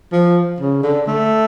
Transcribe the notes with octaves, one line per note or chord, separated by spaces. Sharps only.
F3
C#3
D3
A3